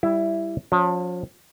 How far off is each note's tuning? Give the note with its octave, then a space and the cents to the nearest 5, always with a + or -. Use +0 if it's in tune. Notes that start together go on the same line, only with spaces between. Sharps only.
G3 +0 E4 +10
F3 +35 C#4 +15